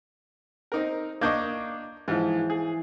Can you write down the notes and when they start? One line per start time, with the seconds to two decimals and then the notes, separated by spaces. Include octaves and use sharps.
0.72 C4 D#4 A#4
1.21 A#3 D4 D#5 C#6 G6 G#6
2.08 G#2 E3 F3
2.50 G#4